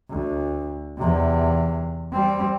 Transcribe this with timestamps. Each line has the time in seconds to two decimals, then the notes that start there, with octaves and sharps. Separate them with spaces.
0.10 D2
0.98 E2 C3
2.12 G3 C4